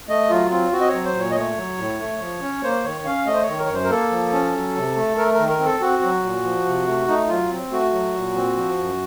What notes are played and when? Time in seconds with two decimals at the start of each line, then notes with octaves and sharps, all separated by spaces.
0.09 A3 D#5
0.30 F#3 F4
0.51 C4 F4
0.72 C4 F#4
0.81 D#5
0.88 C#5
0.94 F#3
1.05 C5
1.15 A#2 C#5
1.31 D#5
1.35 A3 C#5
1.57 F#3
1.78 A2
2.00 A3
2.20 F3
2.41 C#4
2.63 A#3 C5
2.84 D#3 C#5
3.05 C#4 F5
3.27 A3 D#5
3.34 C5
3.43 C#5
3.48 D#3
3.59 A#4
3.66 F#2 C#5
3.74 C5
3.84 A#4
3.90 A#3 A4
4.11 F3
4.33 C#4
4.54 F#3
4.76 C3
4.96 A3
5.17 A3 A#4
5.34 A#4
5.39 D#3
5.49 A#4
5.59 C4
5.65 A4
5.80 C4 F#4
6.03 F#3
6.24 A#2
6.44 F3
6.65 C3
6.87 A3
7.08 A3 D#4
7.29 F#3 F4
7.51 C4
7.71 A3 F#4
7.93 F#3
8.15 A#2
8.36 C4
8.56 F3
8.78 F#2